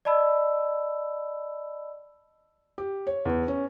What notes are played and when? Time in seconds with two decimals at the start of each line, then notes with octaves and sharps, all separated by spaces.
0.05 D5 D#5 A5 B5 E6
2.78 G4
3.07 C#5
3.25 E2
3.48 C#4